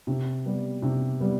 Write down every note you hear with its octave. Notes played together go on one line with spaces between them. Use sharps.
C3
G3 B3
C3
G3 B3